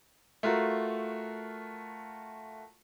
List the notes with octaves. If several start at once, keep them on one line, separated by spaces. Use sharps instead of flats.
A3 F4 F#4 A#4